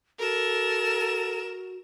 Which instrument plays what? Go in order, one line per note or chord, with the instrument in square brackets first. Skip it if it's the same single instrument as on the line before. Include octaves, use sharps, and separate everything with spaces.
[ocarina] F#4 [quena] A4 [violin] A#4 E7